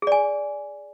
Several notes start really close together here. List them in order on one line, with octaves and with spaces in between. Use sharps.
G#4 D5 G#5